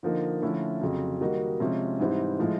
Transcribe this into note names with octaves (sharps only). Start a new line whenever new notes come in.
D3 F3 A#3 D#4
D3 F3 A3 C#4 E4
F2 C#3 F#3
D#3 G3 A#3 D#4 F#4
C3 F3 G#3 C#4
G#2 E3 G3 C4 E4
A2 F3 G#3